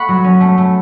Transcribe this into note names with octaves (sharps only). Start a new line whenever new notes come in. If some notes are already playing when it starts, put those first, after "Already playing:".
Already playing: A3 F#5 B5 C#6
F#3
C#4
A3
A3